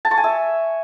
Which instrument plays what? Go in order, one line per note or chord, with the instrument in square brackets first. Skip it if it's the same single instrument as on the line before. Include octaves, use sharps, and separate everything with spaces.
[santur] A5
C#6
G#5
E5